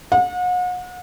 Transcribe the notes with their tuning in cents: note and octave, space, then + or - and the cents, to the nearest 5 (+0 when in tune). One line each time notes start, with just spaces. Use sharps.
F#5 -40